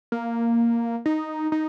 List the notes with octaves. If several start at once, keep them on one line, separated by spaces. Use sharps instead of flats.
A#3
D#4
D#4